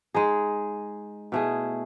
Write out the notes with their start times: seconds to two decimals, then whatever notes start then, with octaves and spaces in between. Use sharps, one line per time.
0.14 G#3 D#4 G#4
1.32 B2 A3 E4 G#4